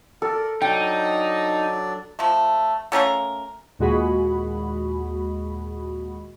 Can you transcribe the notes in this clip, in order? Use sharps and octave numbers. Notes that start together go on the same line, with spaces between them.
A4 A#4 D5
F#3 D4 D#4 D5 G5
F3 A3
A3 C#4 A#4 F5
D#2 A#2 G#3 F#4 G#4 B5